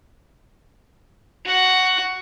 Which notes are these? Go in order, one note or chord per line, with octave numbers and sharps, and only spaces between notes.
F#4 F#5